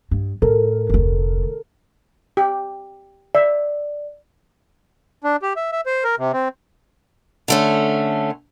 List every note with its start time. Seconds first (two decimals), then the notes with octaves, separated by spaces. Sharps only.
0.11 G2
0.42 A2 A4 A#4
0.89 F1 D2
2.37 G4
3.35 D5 E5
5.24 D4
5.43 G4
5.56 E5
5.72 E5
5.86 C5
6.04 A#4
6.18 C3
6.33 C4
7.48 D3 A3 C#4